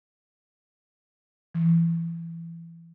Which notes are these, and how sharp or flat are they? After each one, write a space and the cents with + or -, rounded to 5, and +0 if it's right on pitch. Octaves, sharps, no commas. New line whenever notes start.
E3 +25